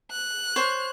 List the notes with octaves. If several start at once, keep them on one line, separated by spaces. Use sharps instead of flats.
F#6
C5 C#5